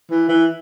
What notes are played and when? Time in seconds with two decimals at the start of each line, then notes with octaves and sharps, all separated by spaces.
0.11 E3
0.29 E3